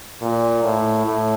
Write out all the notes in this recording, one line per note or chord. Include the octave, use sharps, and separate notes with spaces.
A#2
A2
A2